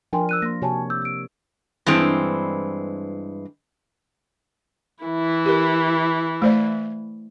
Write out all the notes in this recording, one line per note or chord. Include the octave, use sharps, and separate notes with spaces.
F3 D4 A#4 G5 G#5 C6
E6 F#6 D#7
A#3 C6 A#6
C3 F#4 C#5 G#5 A5
D6 E6 G6
E6 D7
G2 E3 G#3 C4
E3 E4
G4 A#4
A3 C5 D5